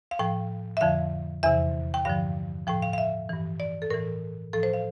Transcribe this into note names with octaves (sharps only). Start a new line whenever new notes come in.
F5
A2 F3 G5
E5
F2 D3 F3 F5
E2 C3 E3 E5
G5
G2 D3 F3 F5
A2 F3 G5
F5
F5
E5
G2 E3
D5
A4
A2 E3 A#4
A2 F3 A4
C5
F5